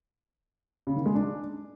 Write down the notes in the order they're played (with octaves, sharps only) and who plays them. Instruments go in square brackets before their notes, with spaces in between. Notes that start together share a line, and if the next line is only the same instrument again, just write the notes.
[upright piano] C#3
D#3
G#3
D4